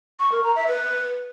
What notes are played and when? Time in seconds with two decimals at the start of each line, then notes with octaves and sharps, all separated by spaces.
0.20 C#6
0.32 A#4
0.44 A#5
0.56 E5
0.68 B4